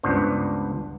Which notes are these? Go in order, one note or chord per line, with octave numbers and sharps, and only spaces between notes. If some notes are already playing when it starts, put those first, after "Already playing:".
C#2 G2 B3 D4 C5